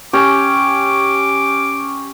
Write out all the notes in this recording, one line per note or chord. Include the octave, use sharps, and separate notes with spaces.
C#4 G4 D6